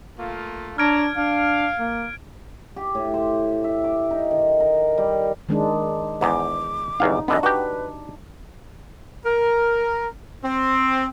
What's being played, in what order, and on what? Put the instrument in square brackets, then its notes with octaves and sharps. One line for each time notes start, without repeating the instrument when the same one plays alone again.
[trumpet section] A3 A#3 F4
[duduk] D4 [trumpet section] C#5 A5 A#5 [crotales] F6 G#6 D7
[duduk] D4 [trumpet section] F5
[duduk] A#3
[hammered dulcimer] G4
A2
C5
E5
D6
D#4
D#3
A#4
G3
[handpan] D#3 G#3 D4
[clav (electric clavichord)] E2 G#2 [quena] D6
[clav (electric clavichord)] G1 E2 F5 [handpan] D#4
[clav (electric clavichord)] F#2 D3 B3 [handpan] D4 [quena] D#5
[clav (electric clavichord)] F#4 G4 [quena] B4
[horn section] A#4
C4